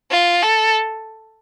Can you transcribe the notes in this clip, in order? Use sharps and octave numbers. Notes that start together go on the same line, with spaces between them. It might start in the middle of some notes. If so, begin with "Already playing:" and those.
F4
A4